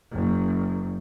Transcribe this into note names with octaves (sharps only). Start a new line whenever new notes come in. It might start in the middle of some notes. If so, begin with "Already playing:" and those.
F#1 F#2